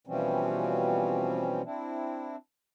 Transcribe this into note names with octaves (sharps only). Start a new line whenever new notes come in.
B2 E3 F3 G3 C4 C#4
C4 D4 E4